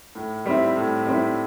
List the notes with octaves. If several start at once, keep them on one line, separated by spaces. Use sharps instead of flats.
A2
G3 C4 E4
A2
G3 C4 E4